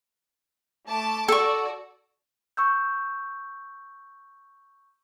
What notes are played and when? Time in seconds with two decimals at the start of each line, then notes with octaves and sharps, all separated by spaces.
0.91 A3 A5 D6
1.28 F#4 A4 D5 C#6
2.57 C#6 E6 G6